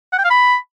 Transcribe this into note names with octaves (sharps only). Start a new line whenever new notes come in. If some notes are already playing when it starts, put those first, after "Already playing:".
F#5
G5
F5
B5